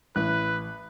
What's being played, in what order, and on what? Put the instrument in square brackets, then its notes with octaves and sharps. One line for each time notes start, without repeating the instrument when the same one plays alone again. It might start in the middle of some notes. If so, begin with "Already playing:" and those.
[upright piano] A1 [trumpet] B4 [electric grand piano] F#6